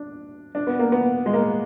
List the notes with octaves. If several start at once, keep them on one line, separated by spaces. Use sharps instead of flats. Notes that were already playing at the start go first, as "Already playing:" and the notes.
Already playing: D4
D4
B3
A#3
B3
G#3
A#3